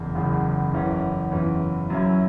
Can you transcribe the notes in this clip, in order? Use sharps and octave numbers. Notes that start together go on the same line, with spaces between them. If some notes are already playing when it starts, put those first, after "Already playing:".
Already playing: F#1 E2 C#3
F#1 E2 C#3
F#1 E2 E3 C#4
F#1 E2 E3 C#4
F#2 F#3 C#4 E4